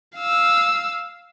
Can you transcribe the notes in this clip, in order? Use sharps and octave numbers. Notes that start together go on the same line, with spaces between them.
F5 E6